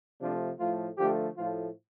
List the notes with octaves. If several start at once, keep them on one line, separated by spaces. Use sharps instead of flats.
C3 F3 A3 D4
A2 F3 A3 F4
D3 F3 A3 G4
A2 F3 A3 F4